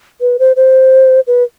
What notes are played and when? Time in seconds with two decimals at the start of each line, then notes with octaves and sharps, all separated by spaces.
0.21 B4
0.39 C5
0.56 C5
1.27 B4